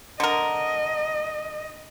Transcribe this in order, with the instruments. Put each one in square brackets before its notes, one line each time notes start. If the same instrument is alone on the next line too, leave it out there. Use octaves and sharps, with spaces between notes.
[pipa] D3 A#4 [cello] D#5